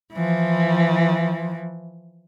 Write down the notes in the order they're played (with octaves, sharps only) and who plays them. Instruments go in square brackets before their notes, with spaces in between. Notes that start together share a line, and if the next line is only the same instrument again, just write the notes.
[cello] E3 F3